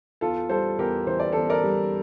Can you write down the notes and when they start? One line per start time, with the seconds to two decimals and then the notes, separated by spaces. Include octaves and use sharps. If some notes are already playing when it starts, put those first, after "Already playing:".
0.21 E2 F4 A4
0.49 G3 A4 C5
0.79 E2 G4 A#4
1.07 E3 C5
1.19 D5
1.32 A4 C5
1.36 E2
1.50 A#4 D5
1.64 G3